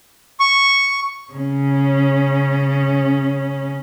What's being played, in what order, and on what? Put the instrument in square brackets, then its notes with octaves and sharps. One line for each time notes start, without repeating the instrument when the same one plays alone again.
[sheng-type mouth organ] C#6
[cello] C#3 C#4